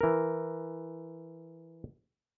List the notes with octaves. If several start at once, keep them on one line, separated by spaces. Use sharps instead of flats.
E3 A#4